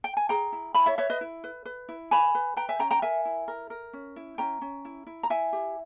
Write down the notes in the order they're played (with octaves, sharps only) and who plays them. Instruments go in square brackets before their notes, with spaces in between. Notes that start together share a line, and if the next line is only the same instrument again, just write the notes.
[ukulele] G5
G#5
G#4 G5 A#5
E4
E4 G#5 B5
C#5 E5
B4 C#5 E5
B4 D#5
E4
B4
B4
E4
B4 G#5 B5
B4
B4 G5 A#5
E5 G#5
C#4 G5 A#5
G5 A#5
A#4 E5 G#5
E4
A#4
A#4
C#4
E4
C#4 G5 A#5
C#4
E4
E4
A#5
E4 E5 G#5
G4